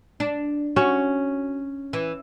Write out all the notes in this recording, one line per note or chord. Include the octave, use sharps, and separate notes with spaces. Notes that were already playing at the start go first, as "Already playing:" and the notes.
D4
C#4 F#4
E3